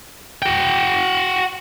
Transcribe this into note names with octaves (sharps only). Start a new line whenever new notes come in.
F#4 G5